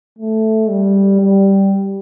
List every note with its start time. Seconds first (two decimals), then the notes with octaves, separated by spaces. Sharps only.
0.18 A3
0.69 G3
1.21 G3